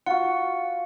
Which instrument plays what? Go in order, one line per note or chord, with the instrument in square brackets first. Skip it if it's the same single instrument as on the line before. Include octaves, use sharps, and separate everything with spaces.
[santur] F4 F#4 [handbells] F#5